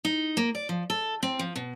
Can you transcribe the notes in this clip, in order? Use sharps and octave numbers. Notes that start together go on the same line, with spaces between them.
D#4
A#3
D5
F3
A4
C4
F3
B2